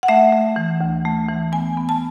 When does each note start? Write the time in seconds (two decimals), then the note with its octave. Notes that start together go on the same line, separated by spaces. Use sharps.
0.03 F#5
0.08 A3 E5
0.33 A3
0.56 E3
0.81 D2
1.05 A3
1.29 E3
1.52 B3 G#5
1.78 B3
1.89 A5